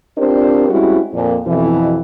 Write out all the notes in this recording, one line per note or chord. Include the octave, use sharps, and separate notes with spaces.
C4 D4 F4 G4 A#4 C5
G3 G#3 C4 C#4 E4 F#4
F2 A#2
F2 B2 E3